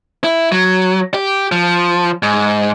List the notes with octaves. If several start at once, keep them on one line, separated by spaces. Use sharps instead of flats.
E4
F#3
G4
F3
G#2